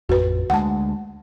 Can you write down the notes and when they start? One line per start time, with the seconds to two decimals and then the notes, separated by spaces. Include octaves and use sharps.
0.09 A1 F2 F#4 B4
0.50 D2 G#3 F#5 A5